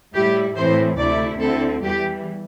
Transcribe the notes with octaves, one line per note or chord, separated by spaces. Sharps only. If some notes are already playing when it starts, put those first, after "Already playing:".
A2 G3 E4 G4
A2 E3 C4 E4 C5
D2 C3 A3 E4 D5
D2 D3 C4 E4 A4
E2 E3 G3 G4